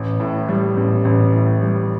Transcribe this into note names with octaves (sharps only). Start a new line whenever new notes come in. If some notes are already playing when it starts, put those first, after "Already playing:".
Already playing: A1
A2
G3
A1
A1
A2
G3